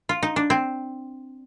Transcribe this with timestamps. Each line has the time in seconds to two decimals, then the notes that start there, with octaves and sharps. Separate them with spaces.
0.09 F4
0.23 D#4
0.36 D4
0.50 C4